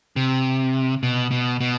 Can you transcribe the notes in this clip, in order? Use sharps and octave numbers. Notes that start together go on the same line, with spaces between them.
C3
B2
B2
B2